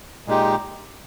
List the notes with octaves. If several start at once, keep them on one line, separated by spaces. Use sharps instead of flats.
A#2 G#3 D#4 G4